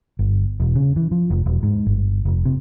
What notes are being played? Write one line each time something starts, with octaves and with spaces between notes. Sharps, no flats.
G1
E1
C#3
E3
F3
F1
E1
G#2
G1
F1
C3